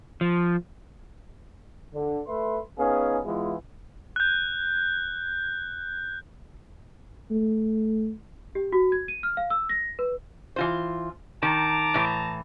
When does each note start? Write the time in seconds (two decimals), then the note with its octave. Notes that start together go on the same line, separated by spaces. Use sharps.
0.21 F3
1.94 D3
2.27 A3 B4 E5 C6
2.79 B3 C#4 D#4 G#4 F5
3.25 E3 G#3 B3 E4 F4
4.16 F#6 G6
7.31 A3
8.55 G4
8.72 F#4
8.92 G#6
9.08 D#7
9.23 F6
9.37 F5
9.50 E6
9.69 A#6
9.99 B4
10.56 E3 F4 C5
11.43 D#3 A5 A#5 D6
11.94 A2 E3